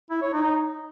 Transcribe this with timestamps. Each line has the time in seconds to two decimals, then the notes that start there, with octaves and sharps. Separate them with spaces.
0.10 E4
0.22 C#5
0.33 D#4